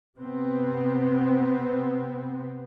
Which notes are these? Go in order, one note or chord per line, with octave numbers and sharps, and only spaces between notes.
C3 B3 C4